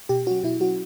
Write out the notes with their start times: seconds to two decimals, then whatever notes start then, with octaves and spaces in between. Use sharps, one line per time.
0.09 B2 G4
0.26 F#3 C#4 F#4
0.43 B2 E4
0.60 F#3 C#4 F#4